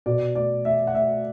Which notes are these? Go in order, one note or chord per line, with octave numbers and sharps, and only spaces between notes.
B2 D5
A3 D5
A3 E5
F#5
A3 E5